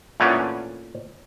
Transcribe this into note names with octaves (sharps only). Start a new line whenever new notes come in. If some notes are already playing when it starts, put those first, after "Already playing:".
A#2 E3 A3 B3 C#4 D4